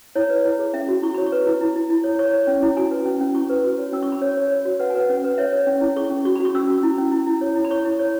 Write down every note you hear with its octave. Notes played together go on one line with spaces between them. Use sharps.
E4 C#5
B4
E4
G#4
C#4 E5
F#4
E4 C#6
C#5 B5
C#6
B4
E4
E4
E4
E4
C#5
C#5 C#6
C#5
C#4
E4
F#4 G#5
B4
C#4
C#4
E4 C#6
B4
F#4
C#5
C#4 E6
C#6
C#4 B5
C#5
C#5
C#5
F#4
B4 F#5
B4 G#5
F#5
C#4
B4
C#5 E5
C#5
C#4
E4
G#4 C#6
C#4
F#4 C#6
B5
F#4 C#6
C#4 E6
C#4
E4
C#4
E4
E4
C#5
E4
B5
C#5 C#6
E4
C#5